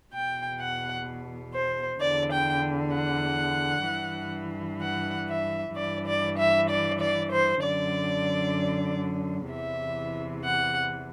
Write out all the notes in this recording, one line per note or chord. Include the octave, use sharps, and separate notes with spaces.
E2 B2 G5
F#5
C5
E2 D3 D5
G5
F#5
G2 E3
F#5
E5
G2 E3 D5
D5
E5
D5
D5
C5
F#2 D3 D5
E2 C3 E3 E5
F#5